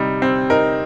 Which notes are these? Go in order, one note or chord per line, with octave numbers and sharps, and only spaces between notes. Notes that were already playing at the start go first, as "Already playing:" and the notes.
Already playing: C3 G3 D#4
C4
D#4 A#4